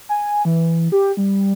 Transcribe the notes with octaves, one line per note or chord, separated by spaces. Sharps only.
G#5
E3
G4
G3